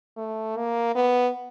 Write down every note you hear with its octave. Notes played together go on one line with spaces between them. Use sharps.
A3
A#3
B3